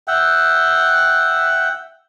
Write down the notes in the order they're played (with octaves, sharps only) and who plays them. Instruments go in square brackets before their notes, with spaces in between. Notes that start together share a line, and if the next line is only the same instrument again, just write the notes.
[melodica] E5 F#5 G5